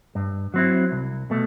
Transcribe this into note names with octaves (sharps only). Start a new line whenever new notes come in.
G2
F#3 C4 E4
C2
B2 A3